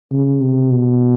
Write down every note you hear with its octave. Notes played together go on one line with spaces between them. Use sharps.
C#3
C3
B2